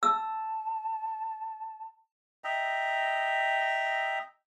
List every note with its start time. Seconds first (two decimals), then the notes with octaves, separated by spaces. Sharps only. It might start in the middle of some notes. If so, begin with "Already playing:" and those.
0.03 A5 E6
2.44 D#5 E5 G5 A#5